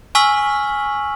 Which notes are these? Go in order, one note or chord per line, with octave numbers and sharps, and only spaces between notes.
G#5 C#6 E6 F6 B6 F#7